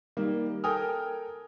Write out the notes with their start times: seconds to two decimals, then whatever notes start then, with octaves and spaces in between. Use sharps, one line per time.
0.17 D#3 G3 A#3
0.64 A4 A#4 G5 G#5 D#6 F6